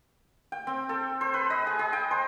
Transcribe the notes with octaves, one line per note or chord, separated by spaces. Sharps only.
G5
C4
A4
C5
B4
D#5
G#4
G#4
G5
C5